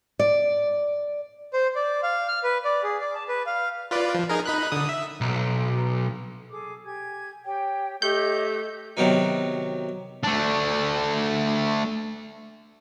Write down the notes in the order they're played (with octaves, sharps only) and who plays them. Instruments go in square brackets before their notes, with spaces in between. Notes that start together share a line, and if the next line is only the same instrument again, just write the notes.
[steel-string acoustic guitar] D5
[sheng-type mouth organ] C5
D5
F5
F6
B4
D5
G#4
D5
A5
B4
F5
[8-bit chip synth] F4 B4 D5
F3
D#4 G#4 A#4
D#4 B5 F#6
D3 D#6
E5
[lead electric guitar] B1
[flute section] G#4 A4 D6
G4 G#5 G#6
[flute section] G4 C#5 [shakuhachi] G5
[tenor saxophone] A3 [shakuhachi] G4 [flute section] C#5 D#5 [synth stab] G6
[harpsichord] C3 D#3 F#3 B3 D#4
[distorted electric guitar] A3 D4